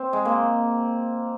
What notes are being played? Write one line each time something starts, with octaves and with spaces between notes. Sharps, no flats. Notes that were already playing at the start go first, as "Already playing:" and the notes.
Already playing: C4
G#3
A#3